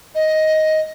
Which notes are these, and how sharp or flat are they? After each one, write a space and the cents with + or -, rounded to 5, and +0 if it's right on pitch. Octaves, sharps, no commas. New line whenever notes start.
D#5 +10